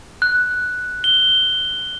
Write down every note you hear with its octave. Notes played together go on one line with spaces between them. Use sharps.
F#6
G7